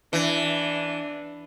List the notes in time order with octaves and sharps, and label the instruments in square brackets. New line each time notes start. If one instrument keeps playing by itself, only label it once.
[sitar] E3 [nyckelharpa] D4